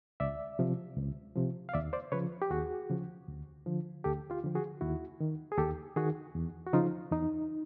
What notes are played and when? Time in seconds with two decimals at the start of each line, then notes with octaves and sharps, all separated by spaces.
0.20 C#2 D5 E5
0.59 C3 F3
0.97 C#2
1.35 C3 F3
1.69 F5
1.74 D#2 D5 E5
1.93 C5 D5
2.12 C#3 F3 B4 C#5
2.42 G4
2.50 D#2 F#4 G#4
2.90 C#3 F3
3.28 D2
3.66 D3 F3
4.04 D2 G4 A4
4.30 F4 G4
4.43 D3 F3
4.55 F#4 G#4
4.81 D#2 E4 F#4
5.20 D#3
5.52 G#4
5.58 D#2 G4 A4
5.96 D#3 F#4 G#4
6.35 E2
6.67 F#4
6.73 C#3 F3 D#4 F4
7.12 E2 D#4